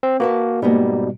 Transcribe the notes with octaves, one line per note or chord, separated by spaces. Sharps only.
C4
A#3 F#4 B4 E5 A5
G#2 B2 G3 A#3 B3 G4